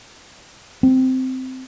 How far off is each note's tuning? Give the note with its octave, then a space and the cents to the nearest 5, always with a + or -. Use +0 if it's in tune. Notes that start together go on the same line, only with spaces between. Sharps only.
C4 -10